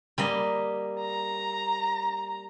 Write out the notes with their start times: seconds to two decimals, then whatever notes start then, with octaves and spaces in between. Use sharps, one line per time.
0.18 G3 A#3 D#5
1.01 A#5